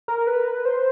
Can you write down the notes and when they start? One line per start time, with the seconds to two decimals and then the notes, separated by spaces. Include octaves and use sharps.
0.08 A#4
0.27 B4
0.65 C5